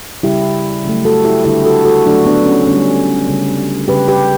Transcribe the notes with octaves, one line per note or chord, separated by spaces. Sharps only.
C#3 G3 E4 G4
C#3 F#3 A3
F#4 A4
E4 G4
D3 G3 E4 G4
F#4 A4
F#4 A4
D3 F#3 A3 D4 F#4
B3 D4
C#4
D3 G3 C#4
C#3 G3
C#3 G3 G4 B4
G4 B4